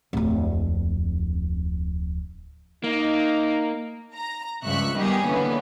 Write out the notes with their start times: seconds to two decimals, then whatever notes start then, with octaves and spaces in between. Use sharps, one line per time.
0.13 D1 F2
2.84 A#3 D#4
4.16 A#5
4.64 C#2 G2 F3 E5 C#6 F#6
4.96 D#3 G3 B3 D#4 G4 G#4
5.26 D3 E3 A#3 B3 C#4